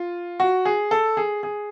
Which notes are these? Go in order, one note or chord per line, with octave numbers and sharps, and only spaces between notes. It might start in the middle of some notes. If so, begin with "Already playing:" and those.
Already playing: F4
F#4
G#4
A4
G#4
G#4